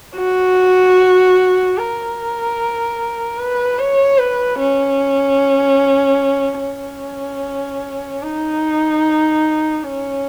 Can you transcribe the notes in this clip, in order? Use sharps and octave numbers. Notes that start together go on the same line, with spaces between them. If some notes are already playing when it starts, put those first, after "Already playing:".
F#4
A#4
B4
C#5
B4
C#4
C#4
D#4
C#4